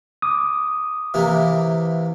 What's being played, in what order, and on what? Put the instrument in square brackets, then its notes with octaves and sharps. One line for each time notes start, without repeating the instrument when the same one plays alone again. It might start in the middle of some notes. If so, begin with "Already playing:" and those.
[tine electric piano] D6 D#6
[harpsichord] C3 E3 A#3